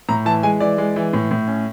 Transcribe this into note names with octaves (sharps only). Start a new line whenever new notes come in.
A2 A#5
E3 A5
G#3 G#5
E3 D5
G#3
E3
A2
A2
C#4